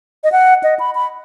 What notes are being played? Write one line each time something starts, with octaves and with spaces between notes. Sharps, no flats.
D#5
F#5
D#5
B5
B5